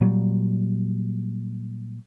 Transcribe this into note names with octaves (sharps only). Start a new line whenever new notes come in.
A#2 F#3 G3